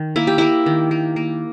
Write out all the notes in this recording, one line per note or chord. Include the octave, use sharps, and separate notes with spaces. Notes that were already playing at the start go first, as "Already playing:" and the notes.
Already playing: D#3
A#3 E4
G4
A#3 E4
D#3
A#3
A#3